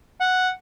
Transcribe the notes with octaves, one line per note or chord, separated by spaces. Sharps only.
F#5